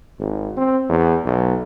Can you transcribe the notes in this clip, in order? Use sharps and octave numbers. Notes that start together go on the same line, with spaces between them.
G#1
C4
E2
B1